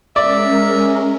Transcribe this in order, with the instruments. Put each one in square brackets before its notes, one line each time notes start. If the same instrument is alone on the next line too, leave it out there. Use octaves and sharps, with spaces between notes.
[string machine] G#3 C#4 A#4 [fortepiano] D5 [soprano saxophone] E5